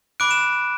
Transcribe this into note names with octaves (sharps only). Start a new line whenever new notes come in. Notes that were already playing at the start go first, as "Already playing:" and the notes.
B5 D6 F#6 D7
E7